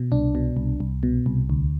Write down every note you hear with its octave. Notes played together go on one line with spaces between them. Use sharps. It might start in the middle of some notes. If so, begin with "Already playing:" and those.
Already playing: B2
C2 D4
B2
C2
C2
B2
C2
D2